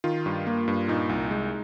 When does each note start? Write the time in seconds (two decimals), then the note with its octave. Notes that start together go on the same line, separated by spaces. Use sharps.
0.04 D#3 F4
0.26 G2
0.47 A#3
0.68 G2
0.88 A#2 D#4
1.09 C2
1.31 G#3